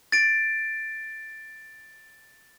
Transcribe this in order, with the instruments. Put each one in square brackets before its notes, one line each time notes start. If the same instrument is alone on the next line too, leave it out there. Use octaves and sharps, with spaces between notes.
[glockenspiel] A6 D7